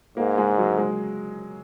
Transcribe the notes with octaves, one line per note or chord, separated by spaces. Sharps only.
G#2 A#3
G#3
F#3
G#3